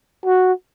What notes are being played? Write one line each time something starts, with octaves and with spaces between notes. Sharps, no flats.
F#4